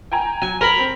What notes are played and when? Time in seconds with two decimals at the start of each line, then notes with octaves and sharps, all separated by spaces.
0.12 G5 G#5 A#5
0.42 F#3 G#5
0.61 A#4 A#5 B5
0.78 C4